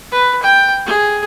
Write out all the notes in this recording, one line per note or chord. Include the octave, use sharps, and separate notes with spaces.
B4
G5
G#4